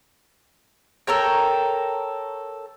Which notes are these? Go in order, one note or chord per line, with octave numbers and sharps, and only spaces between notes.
A4 A#4 C#5 G5